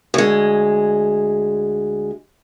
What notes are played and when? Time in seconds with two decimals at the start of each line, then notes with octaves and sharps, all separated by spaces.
0.14 D2 G#3